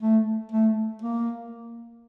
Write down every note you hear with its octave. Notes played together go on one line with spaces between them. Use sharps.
A3
A3
A#3